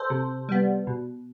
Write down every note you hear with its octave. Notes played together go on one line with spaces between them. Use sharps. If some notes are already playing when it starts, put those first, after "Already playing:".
Already playing: A4 C5
C3
G3 B3
B2